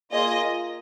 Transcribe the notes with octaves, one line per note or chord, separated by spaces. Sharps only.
A#3 F4 G#4 D#5